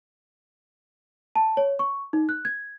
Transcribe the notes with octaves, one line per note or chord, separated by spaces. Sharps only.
A5
C#5
C#6
D#4
F#6
G#6